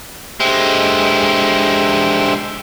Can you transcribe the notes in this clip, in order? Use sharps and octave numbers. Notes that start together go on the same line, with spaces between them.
D3 G#3 G4 C5 E5